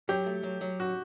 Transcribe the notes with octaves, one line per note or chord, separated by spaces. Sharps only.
F#3 G4
A3
F#3
F#3
F#4